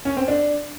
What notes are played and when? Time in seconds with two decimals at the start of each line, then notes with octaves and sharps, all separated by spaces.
0.05 C#4
0.17 C4
0.28 D4